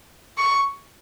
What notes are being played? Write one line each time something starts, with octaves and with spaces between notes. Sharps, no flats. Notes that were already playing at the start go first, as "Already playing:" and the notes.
C#6